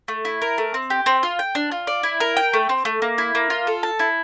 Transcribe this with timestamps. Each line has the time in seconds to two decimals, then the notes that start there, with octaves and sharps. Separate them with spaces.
0.08 A3
0.25 E4
0.42 A#4
0.58 A3
0.74 C4
0.90 G4
1.06 C4
1.23 F4
1.39 G5
1.55 D4
1.71 F4
1.87 D5
2.03 E4
2.20 A#4
2.37 G5
2.53 A3
2.69 C4
2.85 A3
3.02 A#3
3.18 E4
3.35 A#3
3.50 F4
3.67 A4
3.83 A5
3.99 E4